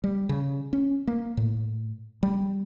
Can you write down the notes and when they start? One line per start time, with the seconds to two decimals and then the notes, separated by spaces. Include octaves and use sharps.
0.04 G3
0.29 C#3
0.73 C#4
1.07 A#3
1.37 A2
2.23 G3